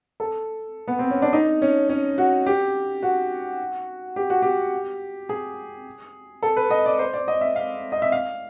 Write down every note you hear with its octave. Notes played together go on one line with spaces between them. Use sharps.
A4
B3
C4
C#4
D4
D#4
C#4
C#4
F#4
G4
F#4
G4
F#4
G4
G#4
A4
B4
D#5
D5
C5
D5
D#5
E5
F5
D#5
E5
F5